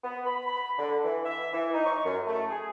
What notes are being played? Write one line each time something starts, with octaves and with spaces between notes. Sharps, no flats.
B3
B5
B5
D3
E3
E5
E3
D#4
C#6
F#2
A3
G#4